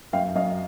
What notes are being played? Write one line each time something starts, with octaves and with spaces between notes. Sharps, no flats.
F#2 F5 G5
F#2 D#5 F5